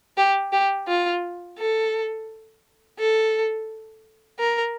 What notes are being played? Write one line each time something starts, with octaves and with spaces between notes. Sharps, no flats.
G4
G4
F4
A4
A4
A#4